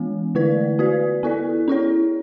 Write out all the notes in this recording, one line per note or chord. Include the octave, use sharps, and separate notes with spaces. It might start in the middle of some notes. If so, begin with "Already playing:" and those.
Already playing: E3 G#3 B3
D3 A3 E4 B4 D5
B3 F#4 B4 D5
B3 E4 A4 D5
C#4 E4 G#4 C#5